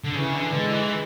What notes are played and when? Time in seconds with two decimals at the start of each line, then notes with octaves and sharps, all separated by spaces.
0.04 D3
0.14 C#3 E3
0.33 D3
0.53 D3 G#3
0.72 E3